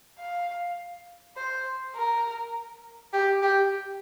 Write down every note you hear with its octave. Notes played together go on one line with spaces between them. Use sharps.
F5
C5
A#4
G4
G4